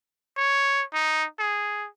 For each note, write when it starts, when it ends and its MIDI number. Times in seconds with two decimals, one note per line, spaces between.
0.36 0.83 73
0.93 1.25 63
1.39 1.87 68